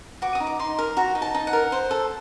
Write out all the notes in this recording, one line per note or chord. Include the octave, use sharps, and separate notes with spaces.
F#4 D6
D#6
D#4
D6
D#4 C6
A#4
F#4 A#5
D#4
A5
D#4
F#5
A#4
C5
A4